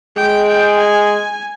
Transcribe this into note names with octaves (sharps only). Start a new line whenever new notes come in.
G#3 G5
G5
G#5